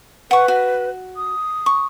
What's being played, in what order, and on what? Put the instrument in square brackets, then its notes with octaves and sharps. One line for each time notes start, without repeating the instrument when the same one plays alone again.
[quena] B4 [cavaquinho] F#5 C#6
[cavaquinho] F#4
[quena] D#6
[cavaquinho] C#6